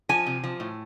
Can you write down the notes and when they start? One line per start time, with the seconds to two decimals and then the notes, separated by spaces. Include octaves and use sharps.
0.09 F3 G#5
0.26 C3
0.44 F3
0.60 A2